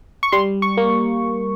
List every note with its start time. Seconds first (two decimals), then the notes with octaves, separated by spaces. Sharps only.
0.23 C#6
0.32 G3 C6
0.62 C#6
0.77 A#3